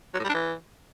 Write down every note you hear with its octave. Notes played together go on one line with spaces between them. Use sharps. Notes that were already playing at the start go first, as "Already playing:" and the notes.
F#3
A2
G3
D4
E3